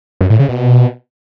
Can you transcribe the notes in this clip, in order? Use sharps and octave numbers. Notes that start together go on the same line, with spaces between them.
F#2
A2
C#3
B2